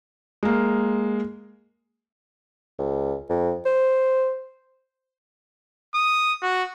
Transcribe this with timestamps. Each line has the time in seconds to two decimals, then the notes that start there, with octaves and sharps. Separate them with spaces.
0.43 G#3 A#3
2.79 C#2
3.30 F2
3.66 C5
5.95 D#6
6.43 F#4